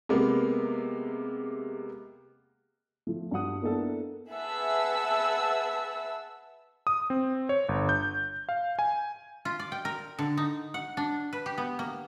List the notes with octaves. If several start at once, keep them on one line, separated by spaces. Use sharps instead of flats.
C3 G#3 A#3 B3
F3 A3
G2 F#4 F#5 D#6
A#3 B3 D4 E4 A4
G#4 B4 E5 F#5 A5 E6
D#6
C4
C#5
G1
G6
F5
G#5
F4
D5
G5
A#4
D3
D#4
F#5
D4
B4
G4
B3
A#3